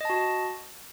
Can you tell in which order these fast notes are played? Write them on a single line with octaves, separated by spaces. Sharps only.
D#5 A5 F#4